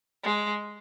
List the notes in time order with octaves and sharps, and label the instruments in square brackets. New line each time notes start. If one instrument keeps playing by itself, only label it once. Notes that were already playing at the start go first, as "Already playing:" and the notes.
[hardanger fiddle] G#3